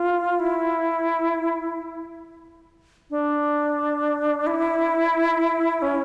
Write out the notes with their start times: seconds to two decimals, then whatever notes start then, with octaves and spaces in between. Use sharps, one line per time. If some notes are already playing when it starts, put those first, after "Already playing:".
Already playing: F4
0.40 E4
3.10 D4
4.47 E4
5.82 C#4